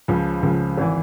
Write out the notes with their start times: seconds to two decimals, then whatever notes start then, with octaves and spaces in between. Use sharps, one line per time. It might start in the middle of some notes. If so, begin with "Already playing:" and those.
0.08 C#2 C#3 F3
0.42 C#2 C#3 F3
0.77 G#1 E3